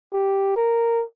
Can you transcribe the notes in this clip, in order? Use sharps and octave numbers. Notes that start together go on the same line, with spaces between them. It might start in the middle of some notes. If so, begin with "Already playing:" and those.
G4
A#4